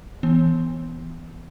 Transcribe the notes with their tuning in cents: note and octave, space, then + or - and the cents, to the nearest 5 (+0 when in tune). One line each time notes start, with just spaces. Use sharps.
E3 +0 B3 +0